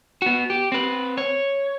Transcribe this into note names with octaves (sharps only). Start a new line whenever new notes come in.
B3 F#4
G4
C4 B4
C#5